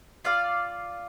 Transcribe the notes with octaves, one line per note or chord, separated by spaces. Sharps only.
F4 D5 F5